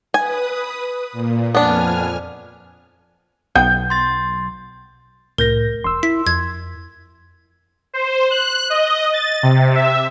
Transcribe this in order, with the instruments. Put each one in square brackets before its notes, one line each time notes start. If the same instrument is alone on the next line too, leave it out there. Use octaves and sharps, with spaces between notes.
[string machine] B4 D#6 [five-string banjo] G#5
[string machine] A#2
[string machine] F2 G#5 F6 [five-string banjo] B3 D4
[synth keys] B1 [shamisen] B3 G5 [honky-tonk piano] G6
[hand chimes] C6 A6
[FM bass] C2 [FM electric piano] A2 G6 A#6 [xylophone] A#4
[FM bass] E1 [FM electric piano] C6 E6
[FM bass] E4 [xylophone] B6
[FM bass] F2 [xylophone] G#6
[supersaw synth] C5
F#6
D#5
A6
C3
E5